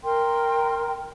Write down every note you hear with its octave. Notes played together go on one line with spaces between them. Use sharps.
A#4 G5 C6